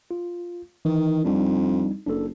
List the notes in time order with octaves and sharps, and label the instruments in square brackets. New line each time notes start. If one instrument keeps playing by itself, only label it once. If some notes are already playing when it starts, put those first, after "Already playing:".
[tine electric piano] F4
[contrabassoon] D#3 [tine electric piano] E3
[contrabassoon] F2 [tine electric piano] G3 D4 D#4
[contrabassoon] F#1 [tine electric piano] D4 A4